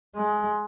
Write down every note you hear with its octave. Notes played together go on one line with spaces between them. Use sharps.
G#3